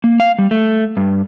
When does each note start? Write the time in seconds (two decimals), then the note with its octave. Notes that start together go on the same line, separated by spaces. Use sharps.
0.04 A#3
0.20 F5
0.39 G3
0.51 A3
0.97 G2